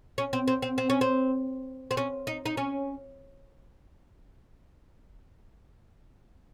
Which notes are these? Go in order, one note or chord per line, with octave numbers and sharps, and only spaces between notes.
C#4
C4
C4
C4
C4
C#4
C4
C4
C#4
D#4
D#4
C#4